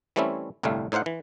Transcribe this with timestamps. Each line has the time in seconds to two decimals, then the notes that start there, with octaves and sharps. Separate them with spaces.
0.16 E3 G3 A3 C4 C#4 E4
0.63 G1 C2 A2 G3 A3 F5
0.92 A2 D#4 C5 F5 F#5
1.06 E3